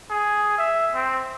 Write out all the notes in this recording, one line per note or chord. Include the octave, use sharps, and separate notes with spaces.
G#4
E5
C4